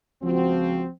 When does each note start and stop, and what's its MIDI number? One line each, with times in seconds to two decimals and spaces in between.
0.22 0.85 37
0.22 0.87 53
0.22 0.87 60
0.22 0.85 65
0.22 0.85 66